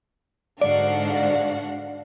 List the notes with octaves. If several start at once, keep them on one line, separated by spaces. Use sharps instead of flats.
G#2 D3 D4 F#4 D5 F5 F#5